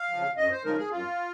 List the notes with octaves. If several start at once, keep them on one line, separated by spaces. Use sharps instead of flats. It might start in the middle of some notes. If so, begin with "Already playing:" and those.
Already playing: F5
C#3 F3
F#2 D#5
C5
C#3 F3 G#3 D#4 A#4
G#4
F#2 F4